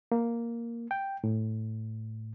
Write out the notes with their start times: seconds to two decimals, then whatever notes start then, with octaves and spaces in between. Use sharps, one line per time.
0.12 A#3
0.91 G5
1.24 A2